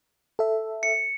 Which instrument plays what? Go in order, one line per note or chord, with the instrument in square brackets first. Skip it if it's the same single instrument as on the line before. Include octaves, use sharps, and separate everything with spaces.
[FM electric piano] A4 E5
[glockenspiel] C#7